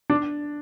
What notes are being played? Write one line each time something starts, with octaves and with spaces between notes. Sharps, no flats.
D4